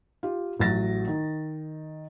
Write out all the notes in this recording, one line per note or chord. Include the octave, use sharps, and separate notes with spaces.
F4 G4
A1 F#3 F#4 A6 A#6
D#3